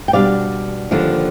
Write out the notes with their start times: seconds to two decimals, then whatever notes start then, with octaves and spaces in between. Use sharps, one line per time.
0.08 G5
0.13 B2 G3 D4 D5 F5
0.91 D#2 D3 F3